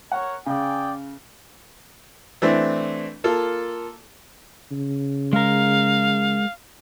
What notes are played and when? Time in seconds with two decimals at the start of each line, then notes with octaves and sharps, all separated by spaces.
0.12 A#4 C#5 F#5
0.46 C#3 G#4 D5 G5
2.42 E3 A3 C4 D4
3.24 A#3 F4 A4
4.71 C#3
5.33 G#3 A#4 F5